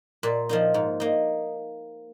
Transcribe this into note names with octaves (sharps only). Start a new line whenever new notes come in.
A#2
F3 A#3 D#4
G#2
A#3 D#4